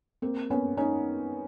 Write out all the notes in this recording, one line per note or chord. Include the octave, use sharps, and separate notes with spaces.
A#3 C4
B3 C#4
C#4 D#4